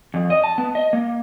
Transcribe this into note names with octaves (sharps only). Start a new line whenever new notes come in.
F2
D#5
A5
B3
D#5
A#3